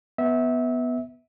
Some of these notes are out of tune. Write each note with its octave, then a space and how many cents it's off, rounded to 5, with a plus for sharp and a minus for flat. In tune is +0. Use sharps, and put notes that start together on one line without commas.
B3 +0 E5 -25